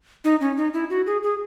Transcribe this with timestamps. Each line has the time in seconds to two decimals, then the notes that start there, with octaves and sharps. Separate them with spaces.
0.24 D#4
0.41 C#4
0.57 D#4
0.74 E4
0.90 F#4
1.06 G#4
1.23 G#4